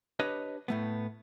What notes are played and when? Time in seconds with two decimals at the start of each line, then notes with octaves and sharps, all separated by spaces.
0.20 D4 G4 B4 C#5 D#5
0.68 A2 A3 B3